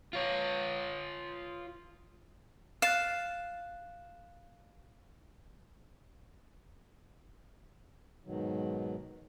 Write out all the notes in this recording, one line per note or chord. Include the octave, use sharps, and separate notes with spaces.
F4 C#5
F5 F#6 A6 E7
G#2 B2 D#3 F#3